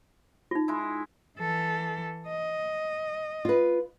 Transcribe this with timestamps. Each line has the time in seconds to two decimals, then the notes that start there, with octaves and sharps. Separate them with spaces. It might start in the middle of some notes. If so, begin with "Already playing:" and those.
0.51 D#4 F4
0.68 G#3 E4
1.38 E3 A4
2.28 D#5
3.45 F4 B4